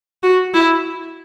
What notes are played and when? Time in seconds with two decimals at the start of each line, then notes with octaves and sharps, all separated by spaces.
0.23 F#4
0.54 E4